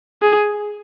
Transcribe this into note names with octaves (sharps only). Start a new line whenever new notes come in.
G#4